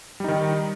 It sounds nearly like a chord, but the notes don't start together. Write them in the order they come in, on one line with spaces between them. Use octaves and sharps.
G3 D#4 D#3